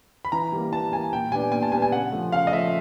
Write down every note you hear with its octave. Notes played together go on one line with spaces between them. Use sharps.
B5
E3 A#5
G3 A#3
E3 A5
G3 A#3 G#5
A#2 G5
G3 B3 D4 G#5
A#2 G#5
A5
G3 B3 D4 G#5
G#5
C#3 F#5
F3 A3
C#3 F5
D#5
F3 A3 E5